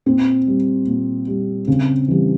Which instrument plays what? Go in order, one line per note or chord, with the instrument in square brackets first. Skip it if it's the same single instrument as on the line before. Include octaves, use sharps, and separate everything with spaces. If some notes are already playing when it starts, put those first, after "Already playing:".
[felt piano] A#2 C4
G3
A#2
G3
C#3 C4
E3 G3